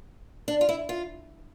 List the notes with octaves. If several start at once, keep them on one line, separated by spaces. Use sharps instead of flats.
D4
F4
E4
F4